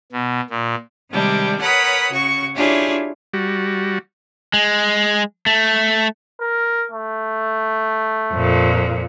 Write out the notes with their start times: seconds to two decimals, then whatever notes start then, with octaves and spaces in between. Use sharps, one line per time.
0.12 B2
0.50 A#2
1.10 C3 D#3 G3 G#3 D4
1.60 A#4 B4 C#5 F#5 B5 D#6
2.11 C#3 F#4 C#6
2.55 D4 E4 F4 G4 G#4 C#5
3.34 G3 F#4
4.54 G#3
5.46 A3
6.41 A#4
6.92 A3
8.33 F2 A#2